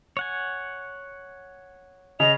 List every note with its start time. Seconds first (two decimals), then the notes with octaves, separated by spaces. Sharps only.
0.17 C#5 F#5 G#5
2.20 C#3 D#5 F7